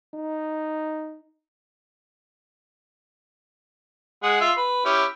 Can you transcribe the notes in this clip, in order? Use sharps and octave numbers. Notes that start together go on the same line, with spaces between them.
D#4
G#3 G#4 F#5
F4 E5
B4
C#4 E4 G4